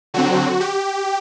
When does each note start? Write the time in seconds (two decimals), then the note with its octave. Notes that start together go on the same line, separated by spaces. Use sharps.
0.14 D3 F#3 C4 F#4
0.60 G4